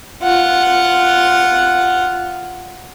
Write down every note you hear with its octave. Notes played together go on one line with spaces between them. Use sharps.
F4 F#5